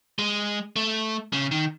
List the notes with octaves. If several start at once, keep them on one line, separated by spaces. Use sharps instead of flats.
G#3
A3
C#3
D#3